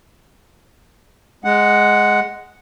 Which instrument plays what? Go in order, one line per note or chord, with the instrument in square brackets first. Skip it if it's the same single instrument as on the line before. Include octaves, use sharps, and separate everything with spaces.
[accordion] G#3 F#5